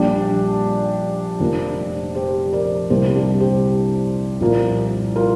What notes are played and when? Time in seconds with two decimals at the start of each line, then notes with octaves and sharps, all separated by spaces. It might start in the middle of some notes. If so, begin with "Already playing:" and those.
Already playing: A#1 A#2 G3 D4 G4
1.40 F1 F2 F3 A#3
2.15 G4 C5
2.53 A#4 D5
2.90 C2 C3 G3 A#3 G4 C5
3.15 D4 G4
3.40 G4 C5
4.41 C2 A#2 F3 A#3
5.16 F4 A#4